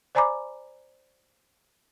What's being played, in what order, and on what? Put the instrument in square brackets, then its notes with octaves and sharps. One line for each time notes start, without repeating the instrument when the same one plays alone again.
[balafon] C5 D5 G#5 A#5 B5 D6